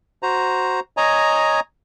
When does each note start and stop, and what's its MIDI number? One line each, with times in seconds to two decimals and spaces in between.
0.23 0.80 66
0.23 0.80 72
0.23 0.80 82
0.97 1.60 73
0.97 1.60 75
0.97 1.60 80
0.97 1.60 82